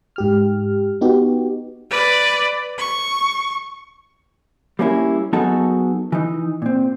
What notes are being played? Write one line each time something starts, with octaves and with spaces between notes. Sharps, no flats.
G#2 G4 F6
B3 D#4 F#4 G4
B4 D5
C#6
G3 A#3 C#4 E4
F#3 B3 D#4 F#4 G#4 A4
E3 D#4
A#2 C4